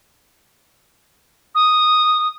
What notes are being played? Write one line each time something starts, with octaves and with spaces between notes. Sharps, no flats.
D#6